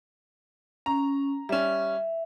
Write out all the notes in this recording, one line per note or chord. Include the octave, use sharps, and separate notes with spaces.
C#4 A#5
G3 C#4 E5